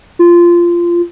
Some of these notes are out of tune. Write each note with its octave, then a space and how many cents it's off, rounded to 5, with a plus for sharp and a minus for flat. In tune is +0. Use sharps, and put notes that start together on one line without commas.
F4 -15